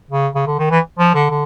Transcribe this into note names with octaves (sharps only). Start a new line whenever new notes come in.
C#3
C#3
D3
D#3
E3
F3
D3
D3